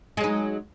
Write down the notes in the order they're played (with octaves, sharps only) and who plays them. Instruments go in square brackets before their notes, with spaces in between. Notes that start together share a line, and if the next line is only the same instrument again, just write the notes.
[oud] G#3
F#3
D#4